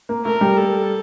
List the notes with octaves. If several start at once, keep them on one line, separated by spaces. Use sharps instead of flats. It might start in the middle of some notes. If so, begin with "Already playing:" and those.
A#3
A3 A#4
G3
A4